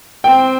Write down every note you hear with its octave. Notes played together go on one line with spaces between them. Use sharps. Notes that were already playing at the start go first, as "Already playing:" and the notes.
C4 G5